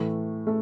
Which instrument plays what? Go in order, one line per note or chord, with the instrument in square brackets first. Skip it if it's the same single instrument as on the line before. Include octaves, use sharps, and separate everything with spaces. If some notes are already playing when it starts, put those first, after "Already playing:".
Already playing: [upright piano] A2 E3 A3
A3